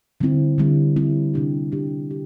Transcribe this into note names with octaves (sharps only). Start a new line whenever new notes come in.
D3 G3 C4 E4
D3 G3 C4 E4
D3 G3 C4 E4
C3 G3 D4 G4
C3 G3 D4 G4
G4